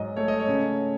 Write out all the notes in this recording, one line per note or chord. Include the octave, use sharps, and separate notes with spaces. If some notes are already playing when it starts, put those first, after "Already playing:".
Already playing: G#2 F#3 D#5
A3 C#5
D#5
C#5
C#3